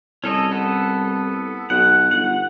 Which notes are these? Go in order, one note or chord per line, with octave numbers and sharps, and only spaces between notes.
C2 C#4 A4 D#5
B3 A4
B1 F#5
G1 F#5